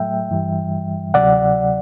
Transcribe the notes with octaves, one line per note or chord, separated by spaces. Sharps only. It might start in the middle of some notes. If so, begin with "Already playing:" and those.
Already playing: A2 F#3 A3 E5 G5
G2 E3 G3
D2 C3 F#3 D5 F#5